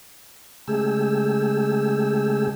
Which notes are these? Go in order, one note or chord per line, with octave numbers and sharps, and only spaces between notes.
C#3 G#3 A3 G4 G#4 E6